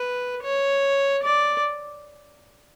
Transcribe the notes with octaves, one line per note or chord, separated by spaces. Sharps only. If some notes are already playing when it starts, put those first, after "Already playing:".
Already playing: B4
C#5
D5